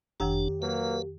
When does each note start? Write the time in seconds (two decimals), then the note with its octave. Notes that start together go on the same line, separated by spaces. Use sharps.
0.20 F#1 F2 D#3 D4 G4 A#5
0.62 F#3 A#3 B4